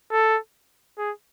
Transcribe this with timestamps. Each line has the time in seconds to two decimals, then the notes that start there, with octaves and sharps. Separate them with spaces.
0.12 A4
0.98 G#4